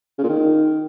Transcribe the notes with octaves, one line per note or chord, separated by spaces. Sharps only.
C#3
A#2
D#3